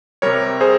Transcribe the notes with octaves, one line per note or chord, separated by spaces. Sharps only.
C3 G3 A#4 C#5
G#4 C5